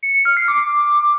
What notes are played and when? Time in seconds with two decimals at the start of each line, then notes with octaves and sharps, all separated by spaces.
0.03 C#7
0.14 C#7
0.25 F6
0.37 C7
0.48 D6